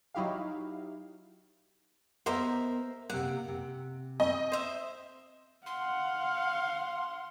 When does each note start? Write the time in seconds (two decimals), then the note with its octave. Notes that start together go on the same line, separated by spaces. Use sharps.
0.14 F#3 D#4 E4 F#4 G4 F5
2.26 B3 A#4 C5 D#5 E5 C6
3.10 C3 A#3 F#5
3.48 C3
4.20 C4 D#5
4.52 C5 E5
5.66 F5 F#5 C6